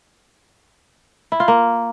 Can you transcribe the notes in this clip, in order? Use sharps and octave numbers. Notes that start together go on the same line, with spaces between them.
E4
F4
A#3